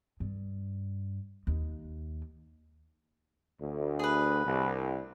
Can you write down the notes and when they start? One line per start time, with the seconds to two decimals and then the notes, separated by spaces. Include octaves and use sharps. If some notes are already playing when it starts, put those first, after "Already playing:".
0.20 G2
1.47 D#2
3.61 D2
3.99 G#4 B4
4.45 C2